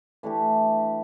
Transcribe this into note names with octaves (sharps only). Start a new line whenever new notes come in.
E3 A3 D4 G4